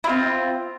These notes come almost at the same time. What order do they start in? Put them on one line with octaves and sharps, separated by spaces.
E4 F4 C4